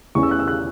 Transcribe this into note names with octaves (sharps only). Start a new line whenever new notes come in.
E2 E3 C#4 C#6
E6
F#6
E6
F#6